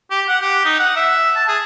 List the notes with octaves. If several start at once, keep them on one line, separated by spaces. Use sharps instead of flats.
G4
F#5
G4
D#4
F#5
E5
A5
G#4